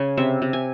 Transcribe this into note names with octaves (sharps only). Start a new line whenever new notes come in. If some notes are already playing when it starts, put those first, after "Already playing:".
Already playing: C#3 G#5
C3 E5
C3
G#5